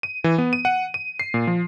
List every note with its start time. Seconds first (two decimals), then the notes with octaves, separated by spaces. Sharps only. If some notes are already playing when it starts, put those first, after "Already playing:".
0.03 D#7
0.24 E3
0.38 B3
0.53 D#7
0.65 F#5
0.94 D#7
1.19 C7
1.34 A#2
1.47 F3